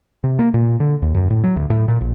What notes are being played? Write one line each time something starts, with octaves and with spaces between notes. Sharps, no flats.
C3
A#3
A#2
D3
D#2
F#2
A2
F#3
D2
A2
A#2
A#1